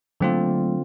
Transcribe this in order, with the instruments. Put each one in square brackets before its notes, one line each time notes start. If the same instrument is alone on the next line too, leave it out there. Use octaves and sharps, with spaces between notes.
[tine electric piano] D3 C4 F4 [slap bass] F#3 A3 A#3